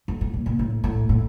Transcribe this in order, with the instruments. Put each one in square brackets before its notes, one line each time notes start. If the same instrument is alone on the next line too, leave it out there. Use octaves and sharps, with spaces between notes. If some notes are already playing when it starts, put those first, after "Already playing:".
[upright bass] F2
A2
A#2
A#2
A2
A2
A2